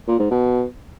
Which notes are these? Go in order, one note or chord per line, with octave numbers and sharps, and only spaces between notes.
A#2
G#2
B2